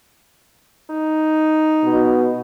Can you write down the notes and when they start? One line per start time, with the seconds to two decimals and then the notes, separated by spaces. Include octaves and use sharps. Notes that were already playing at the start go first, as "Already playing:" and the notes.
0.89 D#4
1.84 B2